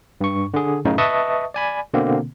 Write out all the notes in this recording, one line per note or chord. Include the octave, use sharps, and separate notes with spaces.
G2 C#6
D3 G#4
F#2 A2 C#3 D#4
B4 D#5 E5 A5 C#6 D#6
D5 G#5 B5
B2 D3 A#3 C4